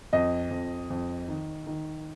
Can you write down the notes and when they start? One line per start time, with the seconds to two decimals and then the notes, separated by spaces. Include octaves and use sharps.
0.13 F2 D#5
0.51 F2
0.90 F2
1.28 D#3
1.67 D#3